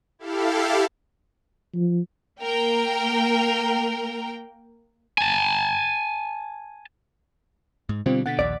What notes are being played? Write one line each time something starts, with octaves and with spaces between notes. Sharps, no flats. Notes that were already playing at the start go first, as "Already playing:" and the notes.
E4 G4 A4 F5
F3
A#3 A#4 G5
G#5 A5
G#2
B2 D3 G3 C4 F4
B2 D3 F#5 A6 B6
A#1 D#2 D5